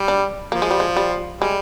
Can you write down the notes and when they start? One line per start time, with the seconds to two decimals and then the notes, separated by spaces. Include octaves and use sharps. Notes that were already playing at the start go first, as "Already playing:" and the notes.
Already playing: G3
0.08 D4
0.52 F3 A#3
0.62 G#3
0.71 G3
0.80 G#3
0.96 G3
1.41 G3 G#3